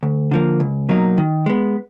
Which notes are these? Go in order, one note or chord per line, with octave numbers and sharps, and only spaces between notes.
D2
D3 F3 A#3
C#2
B2 F#3 A#3 D#4
D#3
G#3 B3